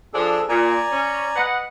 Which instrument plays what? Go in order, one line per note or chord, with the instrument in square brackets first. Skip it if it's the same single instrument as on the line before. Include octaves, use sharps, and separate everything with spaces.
[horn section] F3 D4 [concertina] G#4 A4
[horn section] A#2 [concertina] D5 G#5 A#5
[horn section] C#4
B4 D#5 F#5